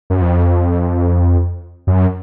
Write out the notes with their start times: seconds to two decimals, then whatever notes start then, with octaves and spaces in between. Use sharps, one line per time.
0.10 F#2
0.22 F2
1.87 F#2